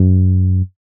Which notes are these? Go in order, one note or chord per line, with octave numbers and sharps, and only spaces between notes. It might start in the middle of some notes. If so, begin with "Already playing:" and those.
Already playing: F#2